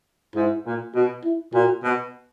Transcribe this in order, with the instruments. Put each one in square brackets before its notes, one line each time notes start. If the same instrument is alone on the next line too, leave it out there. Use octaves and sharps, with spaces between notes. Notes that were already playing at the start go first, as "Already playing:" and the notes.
[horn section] G#2 [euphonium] E4
[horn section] A#2
[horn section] B2 [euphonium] F#4
[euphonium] E4
[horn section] A#2 [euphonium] F#4
[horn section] B2